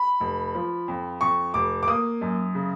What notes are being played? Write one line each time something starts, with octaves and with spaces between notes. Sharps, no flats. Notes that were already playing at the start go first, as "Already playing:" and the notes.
Already playing: B5
F1
F3
F2
F2 C#6
F1 D6
D6
A#3 D#6
F#2
C#3